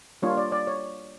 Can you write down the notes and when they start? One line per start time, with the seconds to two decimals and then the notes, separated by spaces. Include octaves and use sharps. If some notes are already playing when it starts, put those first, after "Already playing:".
0.22 G3 A#3 D4 F4 C#5
0.37 D5
0.52 D5
0.67 C#5